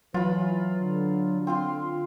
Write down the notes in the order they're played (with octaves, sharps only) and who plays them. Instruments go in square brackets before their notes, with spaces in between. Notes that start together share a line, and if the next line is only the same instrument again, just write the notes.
[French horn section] E3 B4 [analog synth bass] F#3 [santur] F4 B5
[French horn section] D3
[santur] C4 F4 C6